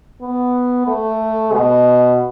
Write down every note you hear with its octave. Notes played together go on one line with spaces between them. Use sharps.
B3
A3
B2